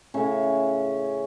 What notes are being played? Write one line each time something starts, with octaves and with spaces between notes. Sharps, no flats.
A2 C#3 C#4 E5